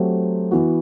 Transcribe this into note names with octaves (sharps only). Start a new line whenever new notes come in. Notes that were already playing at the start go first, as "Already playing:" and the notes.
Already playing: F#3 A3 C4 G4 C5
E3 B3 F#4